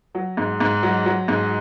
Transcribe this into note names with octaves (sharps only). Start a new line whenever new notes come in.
F#3
G#2
G#2
F#3
F#3
G#2